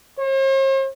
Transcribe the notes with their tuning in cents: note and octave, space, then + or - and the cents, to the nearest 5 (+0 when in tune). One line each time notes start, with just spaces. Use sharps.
C5 +45